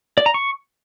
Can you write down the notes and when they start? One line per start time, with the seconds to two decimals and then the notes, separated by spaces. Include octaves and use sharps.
0.18 D5
0.26 A#5
0.34 C#6